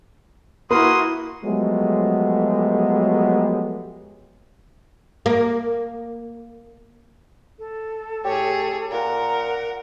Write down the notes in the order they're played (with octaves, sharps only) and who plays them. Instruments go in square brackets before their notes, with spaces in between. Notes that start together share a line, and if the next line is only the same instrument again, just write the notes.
[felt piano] A#3 [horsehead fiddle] E4 F#4 [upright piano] A#4 B4 [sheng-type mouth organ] C6 D#6
[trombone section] F3 F#3 G#3 A3 B3 G4
[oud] A#3
[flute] A4
[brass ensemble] A2 [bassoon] G4 [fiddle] G#4 C#5
[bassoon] A#2 [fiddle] A#4 [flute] F#5 [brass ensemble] A#5